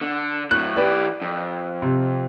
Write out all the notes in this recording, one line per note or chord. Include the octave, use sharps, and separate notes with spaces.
D3
A2 F#3 F#6
E3 G4 B4 D5
F2
C3